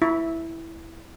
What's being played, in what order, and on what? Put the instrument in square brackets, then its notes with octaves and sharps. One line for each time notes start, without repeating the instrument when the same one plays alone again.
[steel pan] E4